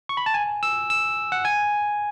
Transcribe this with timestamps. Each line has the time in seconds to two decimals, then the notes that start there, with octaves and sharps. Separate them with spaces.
0.09 C#6
0.17 B5
0.26 A5
0.34 G#5
0.63 E6
0.90 E6
1.32 F#5
1.45 G#5